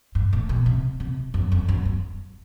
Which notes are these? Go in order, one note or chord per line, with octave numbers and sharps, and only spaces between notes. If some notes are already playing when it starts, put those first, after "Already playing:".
G2
A2
B2
C3
C3
F#2
F2
F#2
G2